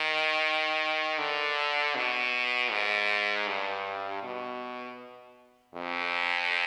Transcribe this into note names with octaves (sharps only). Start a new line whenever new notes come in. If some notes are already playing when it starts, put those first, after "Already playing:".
Already playing: D#3
D3
B2
G#2
G2
B2
F2